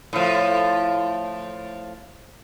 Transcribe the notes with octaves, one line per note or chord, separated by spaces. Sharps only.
A2 F3